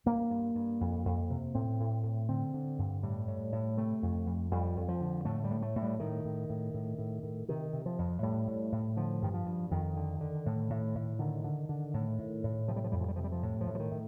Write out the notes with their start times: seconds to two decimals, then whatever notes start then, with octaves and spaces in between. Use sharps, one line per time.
0.06 G2 A#3
0.30 G2
0.55 G2
0.81 F2
1.05 F2
1.30 C3
1.55 A2 C4
1.80 A2
2.03 A2
2.29 D3 C4
2.54 D3
2.78 G2
3.03 A2 G3
3.28 A2
3.52 A2
3.77 C3 A3
4.02 F2
4.27 F2
4.51 F2 G3
4.77 F2
4.88 F3
5.01 D3
5.25 A2 A3
5.44 G3
5.51 A2
5.62 A3
5.76 A2
5.82 G3
6.00 A2 D#3
6.25 A2
6.50 A2
6.74 A2
6.98 A2
7.23 A2
7.48 C3 D#3
7.73 C3
7.86 F3
7.98 F2
8.23 A2 G3
8.47 A2
8.72 A2
8.97 D3 F3
9.22 G2 D#3
9.34 F3
9.46 G2
9.71 F2 D#3
9.96 D3
10.20 D3
10.46 A2
10.70 A2
10.95 A2
11.19 D3 D#3
11.44 D3
11.69 D3
11.94 A2
12.19 A2
12.44 A2
12.68 C3 F3
12.76 G3
12.84 F3
12.92 F2 G3
13.00 F3
13.08 G3
13.16 C3 F3
13.24 G3
13.32 F3
13.43 A2
13.61 F3
13.67 A2
13.75 F3
13.79 D#3
13.91 A2